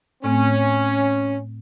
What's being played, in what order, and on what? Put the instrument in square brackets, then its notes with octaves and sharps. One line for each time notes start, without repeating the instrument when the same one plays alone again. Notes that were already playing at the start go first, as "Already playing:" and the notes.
[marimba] A2 A3 C4 [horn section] C#4